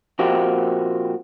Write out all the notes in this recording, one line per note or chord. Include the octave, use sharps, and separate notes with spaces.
A#2 F3 A#3 C4 F#4 G4